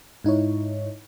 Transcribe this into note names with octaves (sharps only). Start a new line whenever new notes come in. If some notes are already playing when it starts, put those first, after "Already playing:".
G#2 D#4 E4 C#5